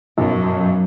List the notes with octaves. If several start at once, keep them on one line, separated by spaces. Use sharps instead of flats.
B1 F#2